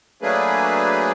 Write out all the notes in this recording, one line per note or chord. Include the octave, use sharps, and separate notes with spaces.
F#3 A3 A#3 D4 G#4 B4